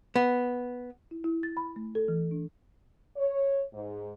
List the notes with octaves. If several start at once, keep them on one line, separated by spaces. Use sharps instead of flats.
B3
E4
E4
A6
B5
A3
A4
E3
D4
C#5
G#2